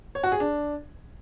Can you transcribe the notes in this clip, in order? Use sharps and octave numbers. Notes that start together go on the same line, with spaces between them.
C#5
F#4
G#4
D4